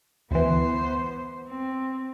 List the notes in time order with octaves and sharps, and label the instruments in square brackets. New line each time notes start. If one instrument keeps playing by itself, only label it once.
[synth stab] D2 E3 [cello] B3 C5
[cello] C4